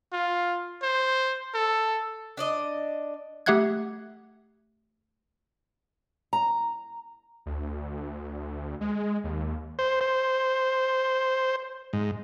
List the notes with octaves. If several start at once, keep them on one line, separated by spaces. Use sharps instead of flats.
F4
C5
A4
D4 D5 D#5
A3 G4 E5 F#5 F#6 G#6
A#5
D2
G#3
D#2
C5
C5
G#2